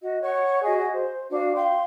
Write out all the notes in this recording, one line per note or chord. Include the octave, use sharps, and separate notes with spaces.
F#4 D#5
C#5 F#5 C#6
F#4 G#4 D#5
C5
D4 F#4 F5
F5 G5 C6